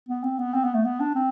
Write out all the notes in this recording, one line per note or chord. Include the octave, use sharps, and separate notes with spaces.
B3
C4
B3
C4
B3
A3
B3
D4
C4